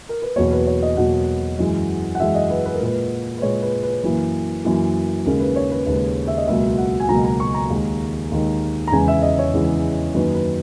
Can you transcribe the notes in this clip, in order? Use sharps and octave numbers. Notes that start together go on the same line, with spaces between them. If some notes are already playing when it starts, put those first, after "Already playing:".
A#4
B4
E2 B2 F#3 A#3 C#5
B4
C#5
D#5
E2 B2 F#3 A#3 F#5
F#2 E3 G#3
F#5
F#2 E3 G#3 E5
D#5
B4
B4
A#4
A#2 G#3 B4
B4
A#2 G#3 C#5
B4
B4
F#2 E3 A#3 B4
F#2 E3 A#3
D#2 C#3 G#3 A#4
B4
C#5
B4
D#2 C#3 G#3 B4
E5
D#5
C#2 B2 F#3 A#3 E5
F#5
G#5
C#2 B2 F#3 A#3 A#5
A#5
C#6
A#5
D#2 D#3 G#3
D#2 D#3 G#3
A#5
E2 C#3 E3 G#3 G#5
E5
D#5
C#5
E2 C#3 E3 G#3
F#2 D#3 A#3 B4
B4